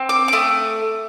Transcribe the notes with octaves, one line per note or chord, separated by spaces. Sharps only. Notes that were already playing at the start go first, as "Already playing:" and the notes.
Already playing: C4
D6
D6
A3 D#6